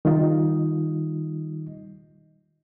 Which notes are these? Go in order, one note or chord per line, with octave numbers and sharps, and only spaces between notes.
D#3 G3 D#4 F4 D#5